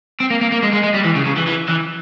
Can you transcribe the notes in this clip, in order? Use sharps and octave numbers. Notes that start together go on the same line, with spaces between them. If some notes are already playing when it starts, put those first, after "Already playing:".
C4
A#3
A#3
A#3
G#3
G#3
G#3
G3
E3
C#3
C#3
E3
E3
E3